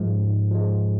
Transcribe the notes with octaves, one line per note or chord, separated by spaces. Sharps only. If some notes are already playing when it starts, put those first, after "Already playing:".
Already playing: G#2 F3 G#3
G#2
F3 G#3